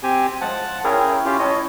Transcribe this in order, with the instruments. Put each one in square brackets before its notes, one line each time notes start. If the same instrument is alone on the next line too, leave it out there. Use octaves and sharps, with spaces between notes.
[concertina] C4 G4 G#5
[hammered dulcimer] F3 G#3 [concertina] F#5 A5
[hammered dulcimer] C#4 E4 G5 [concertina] G#4 A#4
[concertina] C#4 F4 G4
[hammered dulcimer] C#4 C#5 A5 [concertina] D#5